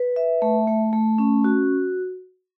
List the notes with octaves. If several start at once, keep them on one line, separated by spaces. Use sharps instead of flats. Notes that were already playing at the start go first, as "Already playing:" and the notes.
Already playing: B4
E5
A3
A3
A3
C#4
F#4